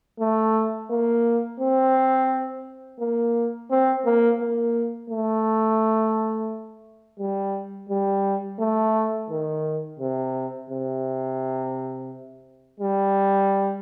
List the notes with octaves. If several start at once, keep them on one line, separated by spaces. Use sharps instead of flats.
A3
A#3
C4
A#3
C4
A#3
A#3
A3
G3
G3
A3
D#3
C3
C3
G3